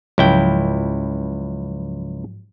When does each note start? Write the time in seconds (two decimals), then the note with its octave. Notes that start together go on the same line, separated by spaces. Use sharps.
0.18 C#2 G#2 F3 F#3 E4 G5